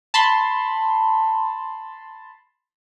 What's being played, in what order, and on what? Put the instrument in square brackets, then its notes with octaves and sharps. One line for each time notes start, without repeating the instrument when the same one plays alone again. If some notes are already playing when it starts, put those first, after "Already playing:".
[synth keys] A5 B5 C6